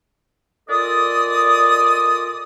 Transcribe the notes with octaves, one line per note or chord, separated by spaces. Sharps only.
A#2 F4 A4 D5 D#5 D#6